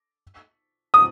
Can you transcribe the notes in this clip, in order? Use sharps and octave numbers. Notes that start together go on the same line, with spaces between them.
D#6